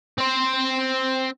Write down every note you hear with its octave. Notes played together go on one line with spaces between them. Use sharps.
C4 C5